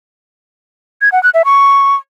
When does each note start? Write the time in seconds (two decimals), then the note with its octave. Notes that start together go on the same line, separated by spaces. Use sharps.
1.01 G#6
1.12 F#5
1.23 F#6
1.34 E5
1.45 C#6